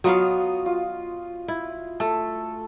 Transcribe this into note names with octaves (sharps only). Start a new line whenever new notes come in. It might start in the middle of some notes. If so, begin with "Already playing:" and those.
F#3 B3 F4 F#4 D#5 F5
F4
E4
A3 A4